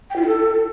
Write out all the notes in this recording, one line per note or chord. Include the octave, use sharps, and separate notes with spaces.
G5
F4
E4
A4